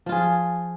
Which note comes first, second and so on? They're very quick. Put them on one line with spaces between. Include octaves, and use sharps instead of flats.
F3 F4 G#4